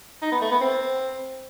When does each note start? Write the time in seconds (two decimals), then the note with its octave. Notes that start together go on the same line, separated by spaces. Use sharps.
0.22 D#4
0.32 B3
0.41 A3
0.51 B3
0.61 C4